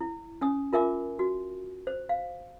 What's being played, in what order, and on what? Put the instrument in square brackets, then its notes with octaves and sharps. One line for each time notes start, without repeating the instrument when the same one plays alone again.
[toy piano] E4
C#4 G#5 D#6
F4 A#4 E5 G#5 D6
F#4
C5
F5